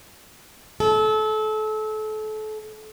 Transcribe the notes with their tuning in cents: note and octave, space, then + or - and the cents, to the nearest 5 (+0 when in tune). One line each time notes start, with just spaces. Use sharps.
A4 -30